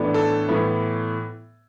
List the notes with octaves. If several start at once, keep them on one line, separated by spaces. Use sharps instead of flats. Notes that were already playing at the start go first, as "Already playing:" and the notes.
Already playing: A2 E3 B3 D4
A4
A2 E3 B3